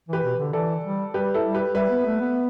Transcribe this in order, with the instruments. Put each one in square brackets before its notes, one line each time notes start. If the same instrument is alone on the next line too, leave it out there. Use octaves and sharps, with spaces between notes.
[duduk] E3 [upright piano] G4 B4
[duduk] B2
D3
[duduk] E3 [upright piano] A4 D5
[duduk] G3
[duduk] G3 [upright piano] G4 B4
[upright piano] E4 A4
[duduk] G3
[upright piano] G4 B4
[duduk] G3 [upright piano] B4 E5
[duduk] B3
A3
B3